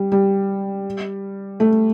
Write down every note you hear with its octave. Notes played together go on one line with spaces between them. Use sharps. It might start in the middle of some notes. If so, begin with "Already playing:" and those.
Already playing: G3
G3
A3